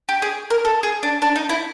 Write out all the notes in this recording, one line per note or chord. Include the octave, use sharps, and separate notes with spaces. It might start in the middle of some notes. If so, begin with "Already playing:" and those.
G4
G#4
A#4
A4
G#4
D4
D4
D#4
E4